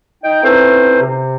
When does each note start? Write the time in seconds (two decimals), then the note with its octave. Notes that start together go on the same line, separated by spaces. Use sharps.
0.23 D#4 G5
0.43 E3 A3 C4 C#4 D#4 C5
1.00 C3